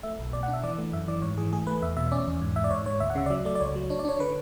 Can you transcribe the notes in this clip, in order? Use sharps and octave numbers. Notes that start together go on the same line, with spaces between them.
A3 E5
B1
B2 D5
F#5
D4
E5
E3 D5
A3
F#2 E5
E3 D5
G#2 C#5
E3 G#4
A3 G#4
A3 B4
E2 E5
B2 E5
E5
C#4 D5
E2
G#2
G#2 E5
D5
G#2 C#5
G#2 C#5
D2 E5
F#5
C#3 E5
D5
F#3 E5
A3 D5
D5
C#2 C#5
F#3
D4 C#5
D5
D4 C#5
D3 B4